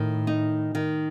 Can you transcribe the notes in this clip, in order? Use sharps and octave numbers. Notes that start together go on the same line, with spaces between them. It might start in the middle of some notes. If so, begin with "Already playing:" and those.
Already playing: A2 D#3
D#4
D#3